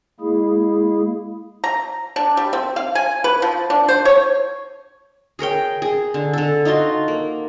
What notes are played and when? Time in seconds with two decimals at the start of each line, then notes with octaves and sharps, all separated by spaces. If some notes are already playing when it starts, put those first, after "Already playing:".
0.20 G#3 A#3 E4 G#4
1.64 A#5
2.16 D4
2.37 G3
2.53 C4
2.76 F5
2.95 G#5
3.24 B4
3.42 F3
3.70 D4
3.88 C5
4.05 C#5
5.39 G#4 A#4 C#5 G5
5.82 G#4
6.14 D3
6.33 D3 A4
6.65 D#4 F4 F#4 C6
7.08 A#3